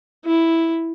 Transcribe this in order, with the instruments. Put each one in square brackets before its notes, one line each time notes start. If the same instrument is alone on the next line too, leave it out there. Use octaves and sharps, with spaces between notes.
[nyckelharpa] E4